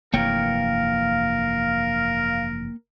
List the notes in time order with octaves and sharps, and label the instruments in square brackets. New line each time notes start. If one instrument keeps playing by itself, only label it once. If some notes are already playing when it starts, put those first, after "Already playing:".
[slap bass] F1 G2 E3 [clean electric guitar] A#3 C#5 G5 [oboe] A#4 [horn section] F5